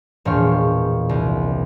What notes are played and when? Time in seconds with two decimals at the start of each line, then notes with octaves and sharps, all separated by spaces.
0.25 E1 A#2 G4 C#5 F5 C#6
1.09 C2